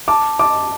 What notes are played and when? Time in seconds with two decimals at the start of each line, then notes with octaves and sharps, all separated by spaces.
0.08 A5 D6
0.39 A5 D6